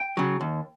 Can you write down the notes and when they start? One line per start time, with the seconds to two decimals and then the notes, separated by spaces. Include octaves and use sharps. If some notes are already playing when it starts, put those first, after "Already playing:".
Already playing: G5
0.17 C#3 F#3
0.41 D#2